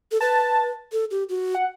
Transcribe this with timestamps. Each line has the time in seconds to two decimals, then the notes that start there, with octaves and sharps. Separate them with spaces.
0.12 A4
0.21 B4 A5
0.92 A4
1.11 G4
1.29 F#4
1.55 F#5